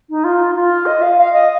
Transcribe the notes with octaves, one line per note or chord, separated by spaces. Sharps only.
D#4
F4
F4
D#5
F5
F5
D#5